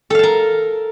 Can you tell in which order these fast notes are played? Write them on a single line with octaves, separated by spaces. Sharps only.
A4 F5 A5 A#4